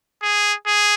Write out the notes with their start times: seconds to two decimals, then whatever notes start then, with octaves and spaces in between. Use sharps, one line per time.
0.22 G#4
0.66 G#4